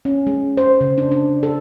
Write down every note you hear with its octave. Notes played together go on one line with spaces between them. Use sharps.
C#4
G#3
C5
C#3
D4
D4
A4